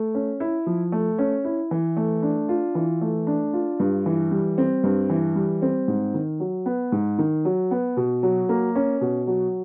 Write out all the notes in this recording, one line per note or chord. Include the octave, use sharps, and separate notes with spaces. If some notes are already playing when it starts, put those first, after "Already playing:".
Already playing: A3
C#4
E4
F3
A3
C#4
E4
E3
A3
D4
F4
E3
A3
D4
F4
G2
E3
G3
C4
G2
E3
G3
C4
G#2
D#3
F#3
B3
G#2
D#3
F#3
B3
B2
F#3
A#3
C#4
B2
F#3